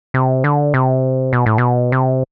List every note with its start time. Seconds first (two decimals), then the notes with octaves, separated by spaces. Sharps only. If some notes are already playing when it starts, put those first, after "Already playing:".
0.14 C3
0.44 D3
0.74 C3
1.33 B2
1.46 A2
1.58 B2
1.92 C3